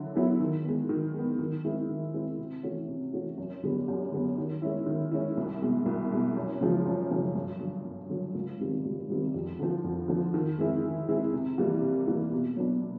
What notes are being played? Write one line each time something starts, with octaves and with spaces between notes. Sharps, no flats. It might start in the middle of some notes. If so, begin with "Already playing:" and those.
Already playing: D3 F#3 E4
F#3 B3 E4 G#4
D#3
G#3 B3
D#3
G#3 B3
D#3
G#3 C4 E4
D#3
G#3 C4 E4
C3
E3 A3 C#4 F#4
C3
E3 A3 C#4 F#4
F#2
D3 G3 B3
F#2
D3 G3 B3
D#3
G#3 C#4 E4
D#3
G#3 C#4 E4
C2
B2 G#3
C2
B2 G#3
F#2
C#3 F3 G#3
F#2
C#3 F3 G#3
G2
D3 F#3
G2
D3 F#3
C#2
C3 D#3 G3 C4
C#2
C3 D#3 G3 C4
F2
D3 F3
F2
D3 F3
D#3
G#3 C4 E4 G#4
D#3
G#3 C4 E4 G#4
C3
E3 G3 A#3
C3
E3 G3 A#3
B2
F#3 B3 D4
B2